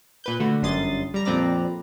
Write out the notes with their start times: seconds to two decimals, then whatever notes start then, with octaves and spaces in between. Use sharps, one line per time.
0.24 A#2 B4 G6
0.40 D3 A3 F#4
0.62 G1 F#2 G3 C6 D#6 A6
1.14 G3 A#5
1.25 F2 A#2 C4 B4 D5 A#5